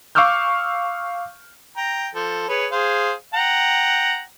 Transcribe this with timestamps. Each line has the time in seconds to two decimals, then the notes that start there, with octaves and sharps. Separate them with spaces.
0.15 F5 C#6 D6 E6 F6 G6
1.77 G5 A#5
2.15 F3 A4
2.49 G#4 B4 C#5
2.72 G#4 C5 F5
3.34 F#5 G5 A#5